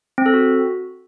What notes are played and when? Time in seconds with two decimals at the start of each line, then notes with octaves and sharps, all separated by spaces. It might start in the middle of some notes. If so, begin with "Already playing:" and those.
0.18 C4
0.26 A4
0.34 F#4